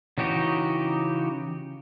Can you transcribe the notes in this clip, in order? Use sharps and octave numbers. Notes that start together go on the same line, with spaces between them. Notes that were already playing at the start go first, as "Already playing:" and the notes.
C#3 E3 D#4 F#4 G4